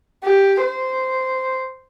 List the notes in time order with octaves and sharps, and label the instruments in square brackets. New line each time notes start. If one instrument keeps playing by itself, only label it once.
[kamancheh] G4
C5